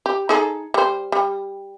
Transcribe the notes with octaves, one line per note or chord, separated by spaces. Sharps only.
G4
D#4 G#4 A4
G3 C5
G3